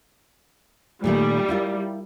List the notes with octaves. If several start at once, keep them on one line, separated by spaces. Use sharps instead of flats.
A#2 D#3 G3 A3
E4 F4 A#4